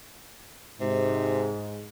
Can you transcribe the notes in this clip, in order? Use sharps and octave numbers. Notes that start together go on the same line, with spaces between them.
G#2 C3